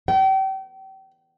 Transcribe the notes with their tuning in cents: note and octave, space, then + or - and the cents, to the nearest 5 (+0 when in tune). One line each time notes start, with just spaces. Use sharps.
G5 -35